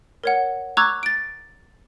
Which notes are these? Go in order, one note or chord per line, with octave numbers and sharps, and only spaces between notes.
A#4 C#5 F#5
A#5 C#6 D6 E6 F#6 G#6
A6 D7